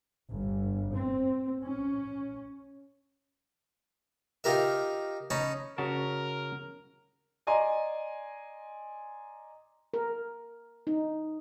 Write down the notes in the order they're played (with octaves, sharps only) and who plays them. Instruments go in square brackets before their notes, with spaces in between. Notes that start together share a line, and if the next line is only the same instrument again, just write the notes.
[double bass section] G1
C4
C#4
[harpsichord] D#4 F4 G4 A#4 E5
C#4 D#4 A5 B5
[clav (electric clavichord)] C#3 F#4 A5 [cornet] A#4
[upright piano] D5 D#5 G#5 A#5 C6
[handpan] A#4
D#4